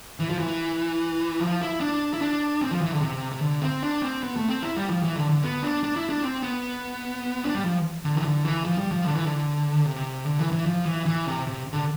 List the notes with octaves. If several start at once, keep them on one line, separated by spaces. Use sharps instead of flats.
E3
F3
E3
F3
E4
D4
E4
D4
C4
F3
E3
D3
C3
C3
D3
C4
D4
C4
B3
A3
C4
E4
G3
F3
E3
D3
D3
B3
D4
D4
E4
D4
C4
B3
D4
G3
F3
D3
E3
D3
E3
F3
G3
F3
D3
E3
D3
C3
D3
E3
E3
F3
E3
E3
C3
C3
D3